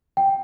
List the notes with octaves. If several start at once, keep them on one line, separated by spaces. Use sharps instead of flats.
G5